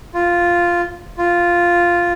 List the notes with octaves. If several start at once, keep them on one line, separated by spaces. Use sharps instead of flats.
F4
F4